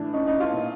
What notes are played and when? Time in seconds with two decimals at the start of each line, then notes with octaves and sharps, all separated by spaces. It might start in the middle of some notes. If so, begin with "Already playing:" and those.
Already playing: A2 E3 D4
0.13 C#4 D#4
0.27 C#4 D#4
0.39 D#4 F4
0.53 A#2